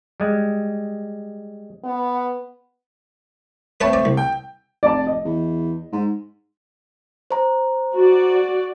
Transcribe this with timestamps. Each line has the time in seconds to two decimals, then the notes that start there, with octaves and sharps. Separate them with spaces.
0.20 G3 G#3
1.84 B3
3.81 A3 C4 B4 C#5 A5
3.93 D5
4.05 C2
4.17 G5
4.83 F1 D5 A5
5.07 D#5
5.25 E2
5.92 G#2
7.31 C5 A#5
7.96 F#4 D5